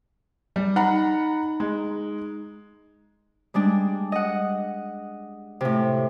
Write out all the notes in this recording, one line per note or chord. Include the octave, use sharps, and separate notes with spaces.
G3
D#4 F#5 A#5 B5
G#3
G3 G#3 D4
D#5 F#5
A2 C3